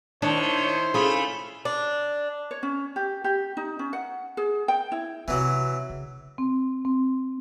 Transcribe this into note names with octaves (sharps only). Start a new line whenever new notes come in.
D#3 D4 E4 C5 C#5
A3 C#4 F4 G#4 B5
D4
C#5
C#4
G4
G4
D#4
C#4
F#5
G#4
G5
E4
C3 E3 F#3 C4
C#3
C4
C4